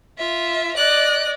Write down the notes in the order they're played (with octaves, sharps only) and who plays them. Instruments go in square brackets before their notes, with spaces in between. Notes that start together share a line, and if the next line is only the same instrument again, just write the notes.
[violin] F4 E5
[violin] D5 D#5 [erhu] F#6